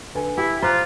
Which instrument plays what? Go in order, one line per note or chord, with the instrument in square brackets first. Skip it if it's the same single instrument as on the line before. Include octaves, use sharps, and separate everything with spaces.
[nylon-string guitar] D3 [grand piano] B4 G#5
[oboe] E4 [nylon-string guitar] G4
[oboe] F4 [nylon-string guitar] C5 [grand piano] A#5 D6 F#6